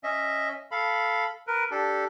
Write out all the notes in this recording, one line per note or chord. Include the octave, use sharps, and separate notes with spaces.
C#4 D#5 E5
A4 F5 B5
A#4 B4
D4 G4 A4